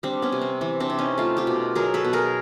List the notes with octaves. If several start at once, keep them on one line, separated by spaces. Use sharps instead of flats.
G3 C4 D4
B3 C#4
C3
C4
E3 C4
C4 D4
C3
C#4 D#4
A3 D#4 F4
F4 G4
B2
F#3 G#4 A#4
A4 B4
B2
G#4 A#4